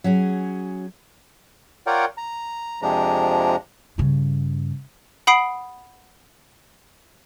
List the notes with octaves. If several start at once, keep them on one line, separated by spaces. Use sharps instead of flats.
F#3 C#4 G#4
F4 A#4 C#5 D5 F#5 G5
A#5
F2 C3 F3 G#3 D4 A#5
G2 C#3
F#5 B5 D#6 C7 D7 F#7